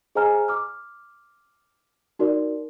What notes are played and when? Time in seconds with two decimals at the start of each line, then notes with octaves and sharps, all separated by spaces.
0.15 G#4 C5 D#5 G#5 A#5 F6
0.49 D6 F6
2.19 D#4 F#4 A#4 D5